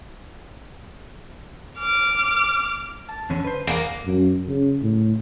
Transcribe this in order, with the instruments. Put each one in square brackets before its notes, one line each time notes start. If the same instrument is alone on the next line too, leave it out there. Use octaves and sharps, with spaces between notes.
[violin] D6 F6
[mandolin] A5
[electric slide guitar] E2 D3 C#4
B4 C5
[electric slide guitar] E2 G#4 [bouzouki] A#3 [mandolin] D5 F#5
[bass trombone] F#2
C#3
A2